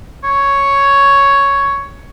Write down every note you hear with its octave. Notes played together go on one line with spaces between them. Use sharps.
C#5